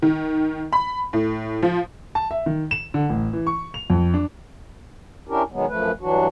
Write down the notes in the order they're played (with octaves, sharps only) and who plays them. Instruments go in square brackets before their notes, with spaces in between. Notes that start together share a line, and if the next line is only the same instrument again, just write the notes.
[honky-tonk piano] D#3
B5
A2
F3
[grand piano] A5
E5
D#3
E7
D3
A1
E3
C#6
F7
F2
D4
[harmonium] C#4 D4 E4 G4 A#4
B2 D#3 F#3 G#3 B3
F#2 F3 A3 B4
G2 E3 F#3 D4 F#4